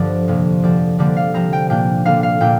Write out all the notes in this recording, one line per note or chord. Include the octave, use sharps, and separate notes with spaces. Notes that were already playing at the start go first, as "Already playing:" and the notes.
Already playing: G2 D3 F3 D4 D5
F2 C3 A#3
D3 F3 C4 D5
D3 G3 A#3 D4 D5
F5
C3 F3 C4 A#5
G5
A#2 A#3 D4 G5
D3 A#3 D4 F5
F5
A#2 A#3 D4 G5